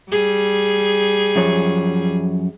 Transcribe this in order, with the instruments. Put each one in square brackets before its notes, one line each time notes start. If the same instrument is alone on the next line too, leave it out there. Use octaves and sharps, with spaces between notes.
[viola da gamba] G3 G#4
[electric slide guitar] F#2 F3 C#5